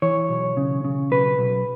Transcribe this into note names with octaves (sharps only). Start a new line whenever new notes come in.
E3 C#5
B1
C#3
C#3
B1 B4
B1